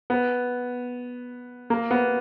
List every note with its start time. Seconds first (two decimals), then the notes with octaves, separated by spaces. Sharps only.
0.10 B3
1.70 A#3
1.91 B3